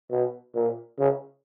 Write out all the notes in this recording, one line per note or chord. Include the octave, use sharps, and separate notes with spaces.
B2
A#2
C#3